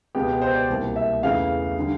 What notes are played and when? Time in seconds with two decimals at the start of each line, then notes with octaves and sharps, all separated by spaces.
0.15 C#2 B2 G#3 B3 G4
0.42 C5
0.55 D5
0.69 C2 B2 G3 A#3
0.96 E5
1.22 E2 C#3 E3 A3 F5
1.79 D3 G3